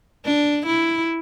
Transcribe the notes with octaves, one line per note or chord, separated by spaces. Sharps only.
D4
E4